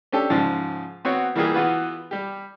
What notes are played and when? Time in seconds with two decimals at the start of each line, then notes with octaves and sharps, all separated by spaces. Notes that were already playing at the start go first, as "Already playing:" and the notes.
0.13 C#4 D4 G4 A4
0.30 G#2 C#3 F3
1.05 B3 C4 F#4 C#5
1.36 E3 G3 A#3 F4 G4 G#4
1.54 E3 B3 F4 F#4 B4
2.11 G3 G4